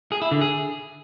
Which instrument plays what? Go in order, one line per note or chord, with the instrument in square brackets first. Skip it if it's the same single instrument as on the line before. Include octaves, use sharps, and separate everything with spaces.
[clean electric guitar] G#4
E4
D3
G#4